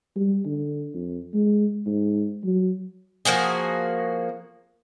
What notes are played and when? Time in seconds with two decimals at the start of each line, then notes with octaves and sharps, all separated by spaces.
0.16 G3
0.46 D3
0.94 F2
1.34 G#3
1.87 G#2
2.44 F#3
3.25 F3 A#3 F#4 G#4